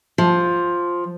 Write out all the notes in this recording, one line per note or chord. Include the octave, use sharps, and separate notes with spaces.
F3